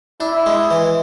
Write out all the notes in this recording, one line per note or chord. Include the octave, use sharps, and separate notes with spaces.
D4 E4
G#3
E3